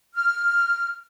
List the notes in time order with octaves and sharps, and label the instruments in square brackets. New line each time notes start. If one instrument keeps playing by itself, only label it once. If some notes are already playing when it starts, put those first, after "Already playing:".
[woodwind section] F6